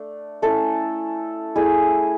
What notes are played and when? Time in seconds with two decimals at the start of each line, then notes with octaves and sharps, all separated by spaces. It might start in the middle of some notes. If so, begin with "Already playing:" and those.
Already playing: A3 D4
0.42 A3 C#4 E4 A4
1.56 A3 E4 G#4